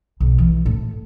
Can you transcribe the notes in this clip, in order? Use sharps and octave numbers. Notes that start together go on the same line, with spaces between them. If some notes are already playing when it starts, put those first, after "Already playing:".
B1
E3
A2